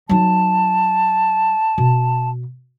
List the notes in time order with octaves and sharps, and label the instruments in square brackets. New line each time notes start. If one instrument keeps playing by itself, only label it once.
[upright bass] F#3 D#4 [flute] A5
[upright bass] B2